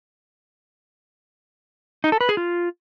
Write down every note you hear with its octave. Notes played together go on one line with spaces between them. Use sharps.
D#4
A4
B4
G#4
F4